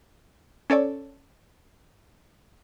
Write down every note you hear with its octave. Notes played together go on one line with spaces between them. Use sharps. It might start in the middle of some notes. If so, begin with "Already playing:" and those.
C#4 A4 C#5 D5